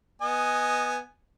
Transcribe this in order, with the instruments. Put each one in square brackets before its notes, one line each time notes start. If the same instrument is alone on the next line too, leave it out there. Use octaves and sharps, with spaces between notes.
[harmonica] B3 D#5 G#5